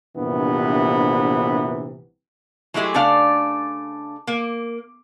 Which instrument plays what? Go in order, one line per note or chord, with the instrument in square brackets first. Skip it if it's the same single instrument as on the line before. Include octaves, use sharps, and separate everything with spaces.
[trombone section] A#1 G2 C3 E3 B3
[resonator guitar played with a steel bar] F#3 G#3 A3 E4 G4 G#4
C#3 A3 D4 D5 F5
A#3